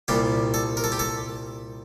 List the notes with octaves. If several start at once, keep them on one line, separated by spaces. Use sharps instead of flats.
C2 A#2 G3 G4
A4
A#4
A4
G4
A4